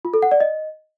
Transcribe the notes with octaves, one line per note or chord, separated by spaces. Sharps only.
F4
A4
F#5
D5
D#5